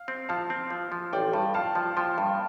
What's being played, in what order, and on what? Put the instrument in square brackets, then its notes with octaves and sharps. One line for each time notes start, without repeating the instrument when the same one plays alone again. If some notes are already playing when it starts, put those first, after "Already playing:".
Already playing: [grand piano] F5
[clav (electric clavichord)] C4
[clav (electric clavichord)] F3 [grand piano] F5 A5
[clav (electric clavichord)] C4
F3
F3
[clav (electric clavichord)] A1 [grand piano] D5 G5
[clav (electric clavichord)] G2
[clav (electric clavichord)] F3 [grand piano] F5 A5
[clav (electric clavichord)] F3
[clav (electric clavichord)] F3 [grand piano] G5 C6
[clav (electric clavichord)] G2